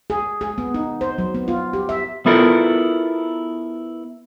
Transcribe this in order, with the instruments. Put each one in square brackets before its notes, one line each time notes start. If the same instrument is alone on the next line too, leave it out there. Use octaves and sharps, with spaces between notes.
[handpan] G#4
G#4
B3
D#4
C5
F#3
B3
F4
G4
E5
[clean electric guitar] B3 E4 F4 A4 A#4